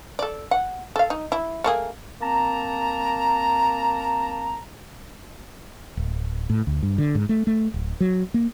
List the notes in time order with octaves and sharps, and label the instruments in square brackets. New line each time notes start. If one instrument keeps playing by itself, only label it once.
[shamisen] A4 D5
F#5
A4 F5
D#4
E4
A3 A#3 G#4
[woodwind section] A#3 C4 A5 A#5
[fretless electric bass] D1
A2
D2
G2
D3
G#2
A3
A3
D1
F#3
A#3